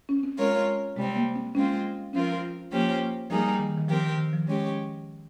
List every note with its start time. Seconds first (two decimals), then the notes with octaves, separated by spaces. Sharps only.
0.09 C#4
0.23 C4
0.38 G#3 C#4 F4 A#4 C#5
0.96 C3 G#3
0.99 G3 C4
1.16 A#3
1.36 C4
1.55 G#3 C4 C#4 F4
2.13 F3 C4 C#4 F4 A#4
2.72 F3 A#3 C#4 G4 C5
3.30 F3 G3 A#3 D#4 G#4
3.59 D#3
3.78 D#3
3.89 F3 C4 G4 A#4
4.04 D#3
4.18 D#3
4.33 F3
4.46 G#3 C#4 G4